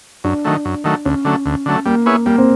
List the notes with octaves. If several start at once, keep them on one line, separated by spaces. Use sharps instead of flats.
F#2 D4
D#3 F#3 A3
F#2
D#3 F#3 A3
D2 C#4
D3 F#3 A3
D2
D3 F#3 A3
G3 A#3
B3 E4 G#4 C#5
G3 A#3
C4